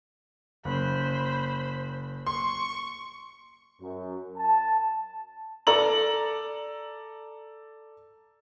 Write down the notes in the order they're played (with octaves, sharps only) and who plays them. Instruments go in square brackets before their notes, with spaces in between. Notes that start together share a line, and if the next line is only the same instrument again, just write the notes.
[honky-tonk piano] F#1 [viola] C5 B5
[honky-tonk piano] C6 [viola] C#6
[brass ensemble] F#2
A5
[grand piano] A4 D5 A#5 F#7